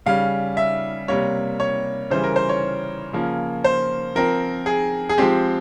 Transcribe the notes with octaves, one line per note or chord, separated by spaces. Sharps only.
C#3 G3 C#4 F5
E5
C3 G3 A#3 C#5
C#5
C#3 E3 G3 C5
A#4
C5
C#5
C#3 F3 A#3
C5
F3 C4 A#4
G#4
G#4
F3 G#3 C4 G4